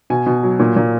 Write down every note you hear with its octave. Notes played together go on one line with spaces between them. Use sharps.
B2 G#5
B2
F#3
A#2
A#2